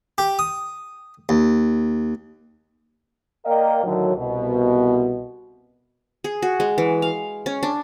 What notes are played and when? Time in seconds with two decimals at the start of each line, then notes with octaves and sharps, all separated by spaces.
0.18 G4
0.39 D#6
1.29 D#2
3.45 A#3 A#4 D5 D#5 F5 G5
3.84 A2 D3 D#3 F#3
4.16 C2 B2
6.24 G#4
6.42 F#4
6.60 G#3
6.78 E3
7.02 F5
7.46 C#4
7.63 D4